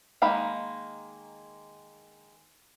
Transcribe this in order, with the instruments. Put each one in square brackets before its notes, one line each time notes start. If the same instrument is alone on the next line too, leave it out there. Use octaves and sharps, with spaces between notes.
[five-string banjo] D#3 G#3 A#3 D#4 B5